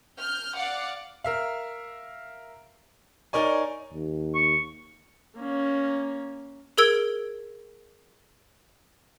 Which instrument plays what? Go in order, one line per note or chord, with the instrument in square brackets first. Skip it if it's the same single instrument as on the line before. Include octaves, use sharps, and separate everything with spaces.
[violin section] F6 G6
D5 F5 F#5 D6
[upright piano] A#4 E5 F5
D#4 A#4 C#5 D5 G#5
[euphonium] D#2
[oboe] C#6
[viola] A#3 C#4
[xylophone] G#4 A#4 E6 G#6 D7